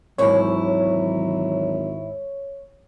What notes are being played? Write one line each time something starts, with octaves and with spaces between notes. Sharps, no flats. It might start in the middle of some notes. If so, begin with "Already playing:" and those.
G#1 D#2 G#2 E3 F#3 E4 C#5